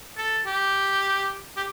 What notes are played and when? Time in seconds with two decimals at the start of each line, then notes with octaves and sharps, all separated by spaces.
0.18 A4
0.46 G4
1.57 G4